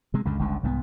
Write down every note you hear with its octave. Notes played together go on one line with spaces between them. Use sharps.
C3 G#3
C#2 F#2 D3
G1 C#2 G2 D3
C2 G#2 E3 B3